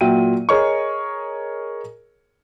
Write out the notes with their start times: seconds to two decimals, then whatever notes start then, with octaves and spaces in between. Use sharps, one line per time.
0.01 A#2 F#3 E5 G5 D#7
0.49 G#4 A#4 C#5 D#5 C#6